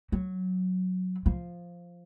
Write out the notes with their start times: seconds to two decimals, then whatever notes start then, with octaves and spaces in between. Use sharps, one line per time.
0.12 F#3
1.26 F3